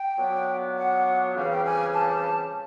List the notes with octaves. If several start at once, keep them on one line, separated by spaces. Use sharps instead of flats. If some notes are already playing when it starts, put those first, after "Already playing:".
Already playing: G5
A#2 F#3 B3 D4
F#5
F2 C#3 E3 G3 F5
G5
G#5
A5